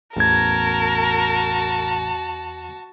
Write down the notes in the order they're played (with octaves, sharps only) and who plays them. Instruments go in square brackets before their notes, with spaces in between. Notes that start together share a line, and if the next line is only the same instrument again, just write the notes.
[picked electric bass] A1 [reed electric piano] E2 G#6 [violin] F#4 A5 [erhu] A#4